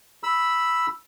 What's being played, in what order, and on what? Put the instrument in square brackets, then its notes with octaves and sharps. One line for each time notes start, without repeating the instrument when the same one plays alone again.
[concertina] B5 E6